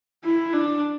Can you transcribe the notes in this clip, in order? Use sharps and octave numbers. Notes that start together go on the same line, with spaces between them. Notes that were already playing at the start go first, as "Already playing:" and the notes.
E4
D4